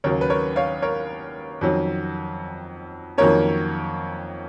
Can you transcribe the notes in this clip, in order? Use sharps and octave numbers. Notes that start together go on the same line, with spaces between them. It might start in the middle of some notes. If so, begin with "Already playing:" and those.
D#2 C#3 F#3 A#4 C#5
B4
A#4 C#5
C#5 F5
A#4 C#5
F2 D#3 F#3 C#4
F2 D#3 F#3 A#3 C#4 A#4 C#5